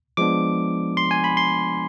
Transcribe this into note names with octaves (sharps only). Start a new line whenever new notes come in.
F3 G#3 B3 D4 D6
C6
G#5
B5
C6